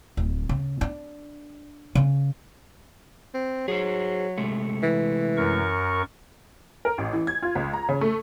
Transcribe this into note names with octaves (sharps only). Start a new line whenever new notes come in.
D1
C#3
D4
C#3
C4
F#3 G#4 C5
C3 G#3 A3
E3
F#2 A#4 C#6
A#4
A1
E3
G#6
F4
C#2
A#5
C#3
A3